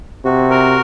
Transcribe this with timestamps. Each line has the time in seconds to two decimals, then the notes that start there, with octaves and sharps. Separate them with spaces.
0.25 C3 F#4
0.51 A#4